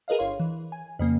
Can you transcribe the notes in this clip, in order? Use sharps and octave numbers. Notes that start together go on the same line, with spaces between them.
G#4 A#4 B4 D#5 F5
G1 C#5 F5 C6
E3
G#5
F2 C#3 A#3